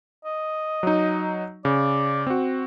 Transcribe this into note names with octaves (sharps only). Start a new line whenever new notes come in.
D#5
F#3 D#4
C#3 D5
C4 F#4